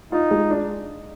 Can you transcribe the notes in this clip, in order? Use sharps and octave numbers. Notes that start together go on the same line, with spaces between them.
D#4 F4
G#3
D4